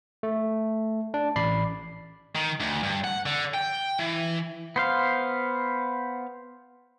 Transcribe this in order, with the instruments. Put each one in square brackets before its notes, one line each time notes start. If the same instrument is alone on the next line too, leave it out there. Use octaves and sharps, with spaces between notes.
[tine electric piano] A3
D4
A1 D5 B5 C7
[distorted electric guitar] D#3
D2
G2
F#5
D3
G5
E3
[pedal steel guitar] B3 C5 F5